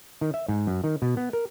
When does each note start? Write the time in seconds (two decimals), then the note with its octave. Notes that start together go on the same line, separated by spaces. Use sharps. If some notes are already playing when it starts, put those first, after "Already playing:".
0.21 D#3
0.34 E5
0.48 G#2
0.67 F#2
0.84 D#3
1.02 B2
1.17 B3
1.33 A#4